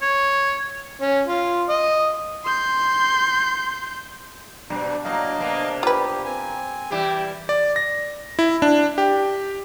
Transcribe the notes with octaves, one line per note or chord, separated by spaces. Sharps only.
C#5
C#4
F4
D#5
C6 G6
G2 B2 G3 D4
A2 F#3 A#3 D#5 F5
C3 A#3 B3
F4 G4 B4
C4 G#5
E3 G3 E4 G4
D5
A#6
E4
D4
G4